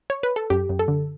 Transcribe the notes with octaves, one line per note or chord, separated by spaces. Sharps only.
C#5
B4
A4
F#2 G4
F#2
A4
D3